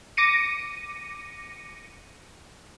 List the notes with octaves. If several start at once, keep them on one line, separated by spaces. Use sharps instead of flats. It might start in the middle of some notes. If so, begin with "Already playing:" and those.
D6 A#6 C#7 D#7